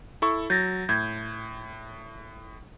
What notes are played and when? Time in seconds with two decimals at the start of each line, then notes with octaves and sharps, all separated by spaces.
0.22 E4 A4 C#6
0.50 F#3 G6 A6 A#6
0.89 A2 G6 G#6